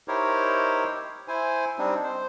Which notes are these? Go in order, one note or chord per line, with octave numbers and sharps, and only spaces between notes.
D#4 E4 G4 A#4 C5 C#5
E4 C5 G#5
G3 C4 D4 D#4
C5